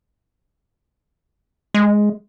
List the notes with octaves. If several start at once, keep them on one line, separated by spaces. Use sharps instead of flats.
G#3